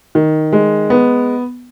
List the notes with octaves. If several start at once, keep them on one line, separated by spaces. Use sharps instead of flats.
D#3
G#3
B3